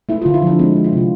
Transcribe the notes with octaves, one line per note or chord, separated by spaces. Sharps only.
A3 E4
F4
D3
E4
F3 D4
G#3 C4
D4
G#3
E4
C3 F4